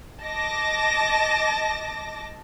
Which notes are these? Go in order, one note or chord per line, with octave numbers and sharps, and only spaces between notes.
D#5 A5 D6 A#6